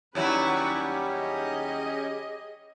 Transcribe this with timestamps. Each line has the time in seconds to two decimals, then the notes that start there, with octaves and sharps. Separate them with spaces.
0.15 D#2 F#3 G3 C#4 E4 G4 B4 C#6
1.15 G#4 D#5